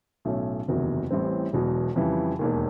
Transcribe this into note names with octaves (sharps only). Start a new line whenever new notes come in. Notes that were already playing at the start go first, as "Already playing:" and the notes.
B1 A2 F#3 A3 C#4
F#1 E2 C3 D#3 F#3
A1 A2 E3 G3 C4
E1 E2 B2 F#3
F2 C#3 E3 G3
E1 D#2 D#3